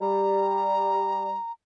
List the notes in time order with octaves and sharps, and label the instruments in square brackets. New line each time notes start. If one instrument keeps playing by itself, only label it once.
[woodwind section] G3 [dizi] A#5